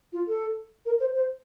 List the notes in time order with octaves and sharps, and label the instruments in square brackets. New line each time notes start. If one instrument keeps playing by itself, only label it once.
[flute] F4
A4
A#4
C5
C5